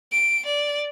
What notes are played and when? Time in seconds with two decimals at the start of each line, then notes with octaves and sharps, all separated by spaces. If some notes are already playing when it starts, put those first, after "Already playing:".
0.12 D7
0.45 D5